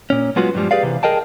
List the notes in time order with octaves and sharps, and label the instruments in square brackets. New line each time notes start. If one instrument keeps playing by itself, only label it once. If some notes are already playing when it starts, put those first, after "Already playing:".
[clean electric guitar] A#2 C#4
F#3 G#3 B3 F4 F#4
G2 F3 G3 G#3
G4 G#4 B4 D5 F5
C3 E3
G#4 A#4 D#5 G5 A5